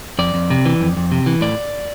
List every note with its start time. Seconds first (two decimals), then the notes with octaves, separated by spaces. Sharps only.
0.19 F2 D5
0.34 F2
0.50 C3
0.66 E3
0.81 F2
0.97 F2
1.12 C3
1.26 E3
1.41 A2 D5